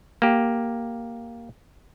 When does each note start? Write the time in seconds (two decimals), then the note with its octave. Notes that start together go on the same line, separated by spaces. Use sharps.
0.22 A#3 G4